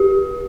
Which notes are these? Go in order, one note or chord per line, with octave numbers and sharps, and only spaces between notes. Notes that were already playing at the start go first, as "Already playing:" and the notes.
Already playing: G4